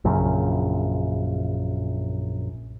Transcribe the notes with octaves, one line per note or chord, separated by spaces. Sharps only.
A#1 F#2 C#3